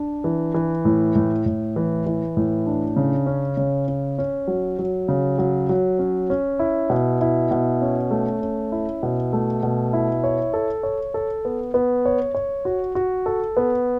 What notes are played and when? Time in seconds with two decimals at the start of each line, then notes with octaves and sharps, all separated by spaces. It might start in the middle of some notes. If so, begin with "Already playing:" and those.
Already playing: D4
0.24 E3
0.54 E3
0.85 A2
1.15 A2
1.46 A2
1.76 E3
2.06 E3
2.37 A2
2.67 D4
2.96 C#3
3.26 C#4
3.57 C#3
3.88 C#4
4.18 C#4
4.47 F#3
4.79 F#3
5.08 C#3
5.38 F#3
5.69 F#3
5.99 C#4
6.30 C#4
6.59 E4
6.90 B2
7.21 E4
7.51 B2
7.82 C#4
8.11 A3
8.41 C#4
8.72 E4
9.03 B2
9.33 A3
9.63 B2
9.93 E4
10.24 C#5
10.53 A4
10.83 C#5
11.14 A4
11.45 B3
11.74 B3
12.05 C#5
12.35 C#5
12.65 F#4
12.95 F#4
13.26 A4
13.57 B3